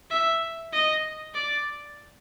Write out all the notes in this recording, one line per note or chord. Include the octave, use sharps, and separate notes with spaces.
E5
D#5
D5